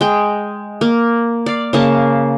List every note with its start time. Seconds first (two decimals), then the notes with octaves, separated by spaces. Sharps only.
0.01 G#3 G5
0.81 A#3
1.46 D5 F5
1.73 C#3 A#3 A5